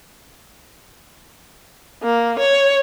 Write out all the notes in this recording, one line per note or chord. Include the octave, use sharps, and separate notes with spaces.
A#3
C#5